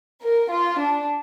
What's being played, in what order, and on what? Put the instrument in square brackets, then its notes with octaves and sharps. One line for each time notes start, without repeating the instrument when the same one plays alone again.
[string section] A#4
F4
D4